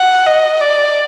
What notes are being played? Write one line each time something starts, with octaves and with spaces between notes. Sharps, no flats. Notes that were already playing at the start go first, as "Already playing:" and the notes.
Already playing: F#5
D#5
D5